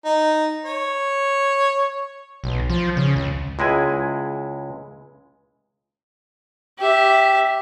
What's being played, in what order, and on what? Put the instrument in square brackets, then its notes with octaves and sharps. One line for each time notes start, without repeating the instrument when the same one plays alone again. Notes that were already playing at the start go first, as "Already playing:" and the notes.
[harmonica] D#4
C#5
[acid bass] B1
F3
C#3
C#2
[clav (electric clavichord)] C#2 G#3 E4 G#5
[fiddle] G4 E5